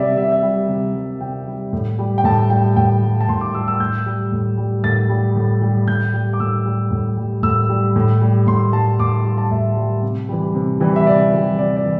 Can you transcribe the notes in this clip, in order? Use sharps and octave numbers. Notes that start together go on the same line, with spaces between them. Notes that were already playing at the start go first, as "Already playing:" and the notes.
Already playing: C3 G3 D5 E5
C3 E5
D5
E5
G3
C3
G3
C3 G5
G3
A2
G3
G5
A2 A5
G3 G5
A2 G5
G3
A5
A2 C6
D6
G3 E6
E6
A2 G6
G3
A2
G3
A2 A6
G3
A2
G3
A2 G6
G3
D6
A2 E6
G3
A2
G3
A2 E6
G3
A2
G3
A2 C6
G3 A5
A2 D6
D6
G3 C6
A5
A2 E5
G3
C3
E3 G3
C3
E3 G3
E5
C3 D5
E3 G3
C3 D5
D5
E3